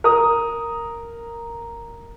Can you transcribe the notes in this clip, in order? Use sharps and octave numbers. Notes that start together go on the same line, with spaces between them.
A#4 D#6